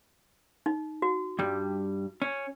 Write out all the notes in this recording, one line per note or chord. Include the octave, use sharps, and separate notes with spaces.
D#4
F#4
G2 G3
C#4